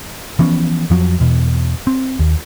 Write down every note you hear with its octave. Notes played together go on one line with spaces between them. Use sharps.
E3 F3 B3 C#4
F2 F3 F#3
E2 B2
C4
D#2